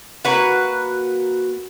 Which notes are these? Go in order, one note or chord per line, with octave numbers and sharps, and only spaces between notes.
A#3 F#4 B4 F#5